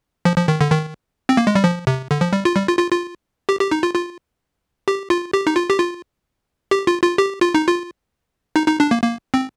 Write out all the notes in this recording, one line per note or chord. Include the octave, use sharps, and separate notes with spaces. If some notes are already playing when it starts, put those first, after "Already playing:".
F3
F3
D#3
D3
D#3
C4
A#3
G#3
G3
F3
C3
D3
F3
G3
F4
G3
F4
F4
F4
G4
G4
D#4
F4
F4
G4
F4
G4
D#4
F4
G4
F4
G4
F4
F4
G4
F4
D#4
F4
D#4
D#4
D4
A#3
A#3
C4